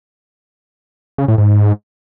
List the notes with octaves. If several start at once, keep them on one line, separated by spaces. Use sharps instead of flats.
C#3
A2
G#2